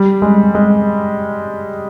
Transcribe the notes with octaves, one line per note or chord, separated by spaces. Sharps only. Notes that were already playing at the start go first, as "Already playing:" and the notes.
Already playing: G3
G#3
G#3